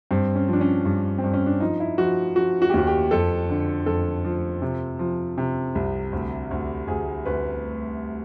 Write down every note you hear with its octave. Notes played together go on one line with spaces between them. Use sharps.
G2 C4
C#4
F3 D4
C#4
G2
C4
G2
C#4
D4
F3 D#4
E4
F3 F#4
F3 F#4
F#4
G4
D#2 F#4
G4
F2 A4
D3
F2 A4
F3
C3
F3
C3
C2
D2
D2
D2 G#4
D2 B4